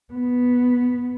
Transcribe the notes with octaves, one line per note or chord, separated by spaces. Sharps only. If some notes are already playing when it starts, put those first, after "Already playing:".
B3